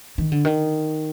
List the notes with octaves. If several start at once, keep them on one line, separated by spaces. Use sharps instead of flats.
D#3
D3
D#3